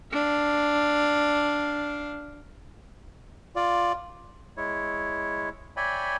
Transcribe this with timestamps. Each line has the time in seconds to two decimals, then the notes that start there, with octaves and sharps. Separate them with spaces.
0.13 D4 F5
3.56 F4 D5
4.57 G#3 E4 C#5
5.77 C#5 D5 E5 G5 G#5 B5